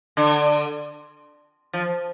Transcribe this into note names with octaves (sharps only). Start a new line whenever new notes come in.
D3
F3